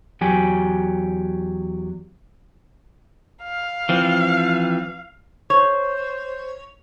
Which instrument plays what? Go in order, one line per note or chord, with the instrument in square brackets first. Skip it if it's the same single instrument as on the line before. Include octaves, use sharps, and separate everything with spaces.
[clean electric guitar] E2 F#3 G4 G#5
[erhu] F5
[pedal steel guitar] E3 F3 C4
[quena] C5 [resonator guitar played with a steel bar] C#5